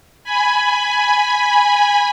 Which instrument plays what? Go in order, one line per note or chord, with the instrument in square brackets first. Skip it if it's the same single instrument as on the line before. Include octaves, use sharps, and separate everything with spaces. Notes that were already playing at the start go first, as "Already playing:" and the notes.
[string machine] G#5 B5